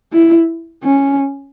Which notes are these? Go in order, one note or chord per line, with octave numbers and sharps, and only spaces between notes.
E4
C#4